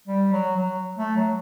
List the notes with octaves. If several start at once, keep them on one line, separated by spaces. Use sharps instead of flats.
G3
F#3
F#3
A3
F#3